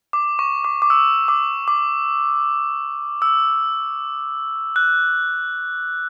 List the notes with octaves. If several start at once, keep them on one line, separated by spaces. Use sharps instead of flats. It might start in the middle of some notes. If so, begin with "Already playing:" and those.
D6
C#6
D6
D6
E6
D6
D6
E6
F#6